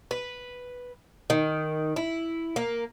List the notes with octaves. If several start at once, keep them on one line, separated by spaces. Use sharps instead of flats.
B4
D#3
E4
A#3